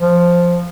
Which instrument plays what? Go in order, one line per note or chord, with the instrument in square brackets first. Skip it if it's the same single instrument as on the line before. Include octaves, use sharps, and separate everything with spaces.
[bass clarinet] F3